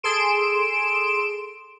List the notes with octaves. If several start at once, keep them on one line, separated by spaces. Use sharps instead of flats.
G#4 A4 C6 D7 E7